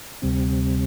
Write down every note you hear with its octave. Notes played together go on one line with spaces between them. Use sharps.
D2 C3 G3 C4